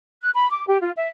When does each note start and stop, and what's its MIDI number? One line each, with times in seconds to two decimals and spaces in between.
0.22 0.30 90
0.35 0.47 83
0.50 0.65 86
0.67 0.78 67
0.81 0.90 65
0.96 1.07 76